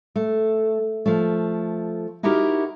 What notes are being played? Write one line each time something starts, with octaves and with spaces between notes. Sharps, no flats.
A3
F3 A3
D#4 E4 F#4 G4 A#4